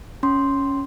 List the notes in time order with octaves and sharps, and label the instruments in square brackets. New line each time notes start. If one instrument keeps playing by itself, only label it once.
[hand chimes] C#4 C6